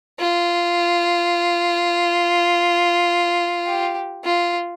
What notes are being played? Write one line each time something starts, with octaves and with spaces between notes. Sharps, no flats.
F4
G4
F4